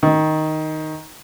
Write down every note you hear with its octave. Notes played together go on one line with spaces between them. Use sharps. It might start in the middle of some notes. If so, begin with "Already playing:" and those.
D#3